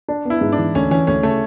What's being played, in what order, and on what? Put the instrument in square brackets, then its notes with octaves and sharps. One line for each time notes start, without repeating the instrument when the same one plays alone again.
[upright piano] D4
[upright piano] B3 [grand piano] E4
[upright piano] G#2
[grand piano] D4
[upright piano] E3
[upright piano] D2 [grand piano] C#4
[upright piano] E3 [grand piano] C#4
[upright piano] D2 [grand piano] C#4
[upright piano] C#3 [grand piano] A3